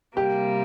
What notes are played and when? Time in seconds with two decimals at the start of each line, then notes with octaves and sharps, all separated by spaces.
0.17 C3 G3 A#3 G4